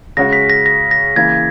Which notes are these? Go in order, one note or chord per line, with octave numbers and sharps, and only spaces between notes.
C#3 G#3 C#4 F#4 A#6
B6
A#6
A#6
A#6
C#3 E3 A#3 G#6